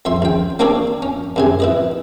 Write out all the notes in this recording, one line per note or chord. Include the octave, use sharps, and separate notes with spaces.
F2 E5 C6
C#2 G5
A#3 C4 D4 A4 C#5 D5
C#4
F#2 C3 G#5
E4 B4 D#5